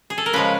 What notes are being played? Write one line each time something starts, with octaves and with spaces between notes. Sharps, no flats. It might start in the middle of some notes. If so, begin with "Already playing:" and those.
G#4
A4
A#4
C#3 F3 G#3 B4